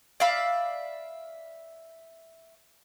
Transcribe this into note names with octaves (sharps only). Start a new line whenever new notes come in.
D5 E5 F5 B5